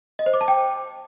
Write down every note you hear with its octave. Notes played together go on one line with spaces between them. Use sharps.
D#5
C5
D6
A5
G5